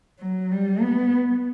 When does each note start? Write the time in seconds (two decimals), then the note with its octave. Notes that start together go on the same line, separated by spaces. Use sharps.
0.19 F#3
0.51 G3
0.81 B3